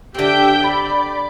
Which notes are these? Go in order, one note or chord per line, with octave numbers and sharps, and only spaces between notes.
D3 C4 G4 E5 G5
D5 B5